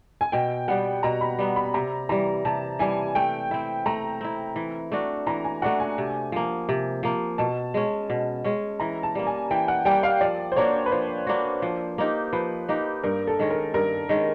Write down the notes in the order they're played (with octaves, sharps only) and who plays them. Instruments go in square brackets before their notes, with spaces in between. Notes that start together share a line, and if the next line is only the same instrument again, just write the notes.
[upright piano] G#5
[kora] B2 [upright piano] G5
[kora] G3 B3 [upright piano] F#5
[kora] B2 [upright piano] A#5
[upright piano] B5
[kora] G3 B3
[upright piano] B5
[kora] C3 [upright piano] A#5
[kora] E3 G3 [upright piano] A#5
[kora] C3 [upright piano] A5
[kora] E3 G3 [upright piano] G#5
[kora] A3 [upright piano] G5
[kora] C4 E4
[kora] A3 [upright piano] A#5
[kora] C4 E4
E3
A3 D4 F#4
[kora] E3 [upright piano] A#5
[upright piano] G#5
[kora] A3 D4 F#4 [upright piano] F#5
[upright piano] G#5
[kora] C3
F3 A#3
C3
F3 A#3
[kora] B2 [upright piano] A5
[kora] G#3 C#4
B2
G#3 C#4
[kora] E3 [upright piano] A#5
[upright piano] A5
[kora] G3 A#3
[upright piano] G#5
[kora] E3 [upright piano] G5
[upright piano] F#5
[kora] G3 A#3 [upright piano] G5
[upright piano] F5
[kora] F3 [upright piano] D5
[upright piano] C5
[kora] A#3 D4 F#4 [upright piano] C#5
[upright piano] B4
[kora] F3 [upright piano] C5
[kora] A#3 D4 F#4
F3
A#3 D#4 G4
[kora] F3 [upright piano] B4
[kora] A#3 D#4 G4
[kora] G2 [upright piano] A#4
[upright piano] A4
[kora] D#3 G#3 C#4
[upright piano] A#4
[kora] G2 [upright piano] A#4
[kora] D#3 G#3 C#4